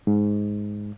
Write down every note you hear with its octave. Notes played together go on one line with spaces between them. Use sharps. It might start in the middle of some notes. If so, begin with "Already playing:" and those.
G#2